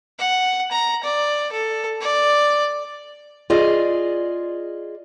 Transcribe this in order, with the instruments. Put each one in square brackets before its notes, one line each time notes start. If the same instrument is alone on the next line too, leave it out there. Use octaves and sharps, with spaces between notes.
[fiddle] F#5
A#5
D5
A4
D5
[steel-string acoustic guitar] F4 G#4 D5 D#5